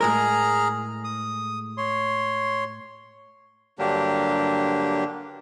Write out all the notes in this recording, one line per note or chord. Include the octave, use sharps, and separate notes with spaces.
A2 G#3 G#4 A#4 A#5 F6
D#6
C#5 C6
G2 D3 F#3 A#3 D4 G4